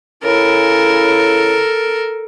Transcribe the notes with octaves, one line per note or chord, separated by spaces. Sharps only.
C#3 E4 A4 A#4